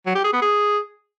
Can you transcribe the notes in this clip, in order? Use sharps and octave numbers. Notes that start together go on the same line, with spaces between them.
F#3
G4
G#4
B3
G#4